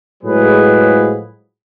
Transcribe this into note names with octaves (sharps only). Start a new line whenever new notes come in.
A2 F3 F#3 G#3 G#4 B4